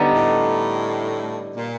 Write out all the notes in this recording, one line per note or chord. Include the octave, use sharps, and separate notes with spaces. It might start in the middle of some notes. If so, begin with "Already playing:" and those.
Already playing: D3 G3 B3 D#4
A2
A#2